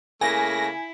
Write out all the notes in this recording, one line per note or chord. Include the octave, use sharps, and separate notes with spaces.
C#3 A3 A#3 E4 G#5 A#6